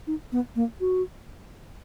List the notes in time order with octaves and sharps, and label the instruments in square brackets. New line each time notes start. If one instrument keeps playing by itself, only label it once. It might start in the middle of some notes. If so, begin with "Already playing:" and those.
[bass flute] D#4
B3
A#3
F#4